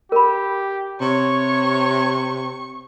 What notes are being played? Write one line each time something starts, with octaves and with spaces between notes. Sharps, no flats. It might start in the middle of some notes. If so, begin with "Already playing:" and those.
G4 A#4 B5
C3 C#5 C#6